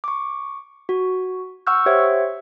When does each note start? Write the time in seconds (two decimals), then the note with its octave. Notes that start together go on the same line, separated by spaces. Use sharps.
0.04 C#6 D6
0.89 F#4
1.67 F#5 C#6 E6 F6 G6
1.86 G4 C5 C#5 E5 F#5